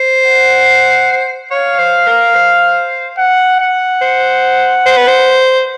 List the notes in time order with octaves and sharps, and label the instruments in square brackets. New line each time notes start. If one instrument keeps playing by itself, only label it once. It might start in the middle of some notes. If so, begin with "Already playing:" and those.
Already playing: [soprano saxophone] C5
[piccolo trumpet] F#5
[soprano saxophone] C#5 [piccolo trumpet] F5
[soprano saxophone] C5
A#4
C5
[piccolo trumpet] F#5
F#5
[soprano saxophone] C5
C5
B4
C5